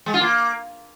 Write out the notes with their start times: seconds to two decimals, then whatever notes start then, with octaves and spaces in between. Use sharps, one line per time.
0.06 G#3
0.14 F4
0.21 A#3